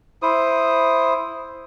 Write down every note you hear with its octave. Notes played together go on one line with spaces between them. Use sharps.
E4 C5 D#6